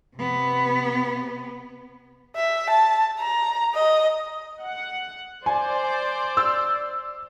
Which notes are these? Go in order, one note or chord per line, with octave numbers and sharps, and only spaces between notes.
C3 B3
E5
A5
A#5
D#5
F#5
C5 D5 G#5
E6